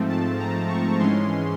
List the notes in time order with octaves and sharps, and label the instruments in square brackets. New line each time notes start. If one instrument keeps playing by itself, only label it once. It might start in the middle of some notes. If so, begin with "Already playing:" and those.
Already playing: [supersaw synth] G#2 F3 A3 C4
A5
A#5
C#6
G#2 E3 G#3 C#4 C6